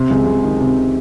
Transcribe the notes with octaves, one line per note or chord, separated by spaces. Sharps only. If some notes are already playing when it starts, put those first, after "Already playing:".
Already playing: C3
C#2
C#2
D#3
C3